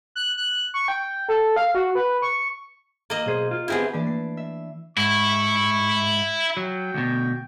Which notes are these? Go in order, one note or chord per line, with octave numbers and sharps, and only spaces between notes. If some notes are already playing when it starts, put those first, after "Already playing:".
F#6
F#6
C#6
G5
A4
F5
F#4
B4
C#6
A#3 D#5
B1 G#4 C5
F4
D3 B3 C4 E4 G4 G#4
E3 A#3 D4 D5
A3 C7
E5
G#2 E4 C#6
F#3 G5
D2 B2